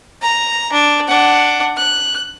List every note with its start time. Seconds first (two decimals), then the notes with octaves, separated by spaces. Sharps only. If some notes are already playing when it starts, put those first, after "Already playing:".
0.22 A#5
0.72 D4
1.07 D4 F#5
1.77 F#6